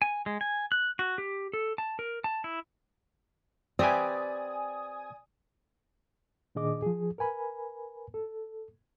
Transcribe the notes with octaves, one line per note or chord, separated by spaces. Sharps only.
G#5
G#3
G#5
F#6
F#4
G4
A4
A5
A#4
A5
E4
C4 G4 B4 D5 G#5 D#6
A#2 D#3 D4 G#4 D#5 D6
F3 G#4
A#4 B4 G#5 B5
A4